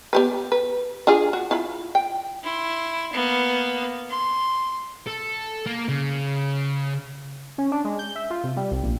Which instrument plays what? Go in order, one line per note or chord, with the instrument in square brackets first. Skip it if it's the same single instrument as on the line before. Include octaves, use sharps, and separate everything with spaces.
[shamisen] B3 G4 B4
B4
D4 F4 G#4
F#4
E4 F4 B5
G5
[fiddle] E4 C6
A#3 B3
C6
[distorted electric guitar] A4
A#3
C#3
[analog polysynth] C#4
D4
G#3
G6
E5
F4
C3
G3
C2
A#1